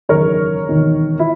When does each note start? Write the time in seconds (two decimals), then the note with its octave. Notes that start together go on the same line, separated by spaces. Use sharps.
0.09 F#1 E2 D#3 A#4 C#5
0.69 E1 D#2 D#3
1.19 E4